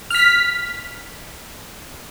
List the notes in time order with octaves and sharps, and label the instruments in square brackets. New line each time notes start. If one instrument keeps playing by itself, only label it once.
[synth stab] F6 B6